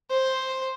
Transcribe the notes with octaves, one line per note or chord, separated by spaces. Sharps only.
C5